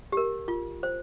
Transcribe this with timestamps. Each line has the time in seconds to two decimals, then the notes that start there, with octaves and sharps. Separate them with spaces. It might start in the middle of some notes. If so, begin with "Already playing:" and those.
0.12 G4 A#4
0.48 F4
0.83 C5